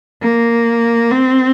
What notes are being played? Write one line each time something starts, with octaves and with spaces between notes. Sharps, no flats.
A#3
C4